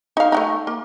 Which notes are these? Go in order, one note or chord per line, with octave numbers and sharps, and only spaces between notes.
D#4 F5
A3 B3 D#4
A#3